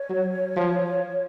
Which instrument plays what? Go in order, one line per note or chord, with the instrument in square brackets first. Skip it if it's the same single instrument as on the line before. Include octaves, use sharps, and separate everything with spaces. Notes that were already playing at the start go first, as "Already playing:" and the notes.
Already playing: [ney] C#5
[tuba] F#3
F3